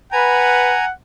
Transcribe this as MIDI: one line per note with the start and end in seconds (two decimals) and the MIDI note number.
0.12 0.73 71
0.12 0.93 78
0.12 0.85 80
0.12 0.85 82